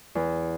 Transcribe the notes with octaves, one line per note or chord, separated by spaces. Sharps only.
E2